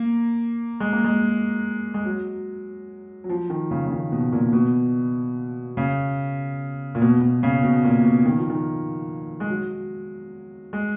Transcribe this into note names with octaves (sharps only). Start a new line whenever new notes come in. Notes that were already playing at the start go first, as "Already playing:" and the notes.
Already playing: A#3
G#3
A#3
G#3
G#3
F#3
F#3
F3
D#3
C#3
C#3
D#3
B2
A#2
B2
C#3
A#2
B2
B2
C#3
B2
A#2
B2
D#3
F3
D#3
G#3
F#3
G#3